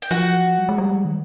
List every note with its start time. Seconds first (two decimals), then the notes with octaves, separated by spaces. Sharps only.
0.02 G5
0.11 F3 F#4 F#5
0.58 G3
0.69 G#3
0.78 G3
1.05 D#3